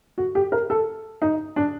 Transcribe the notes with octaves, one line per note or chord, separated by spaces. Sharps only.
F#4
G4
A#4
A4
D#4
D4